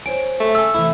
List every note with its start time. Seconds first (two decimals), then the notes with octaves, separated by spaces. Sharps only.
0.06 C5 C#5 G#5 D7
0.40 A3
0.55 C#3 G#5 E6
0.75 C3 E3 A3 E4